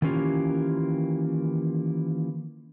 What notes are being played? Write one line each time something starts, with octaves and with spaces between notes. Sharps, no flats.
D#3 E3 A#3 C#4 F4 G4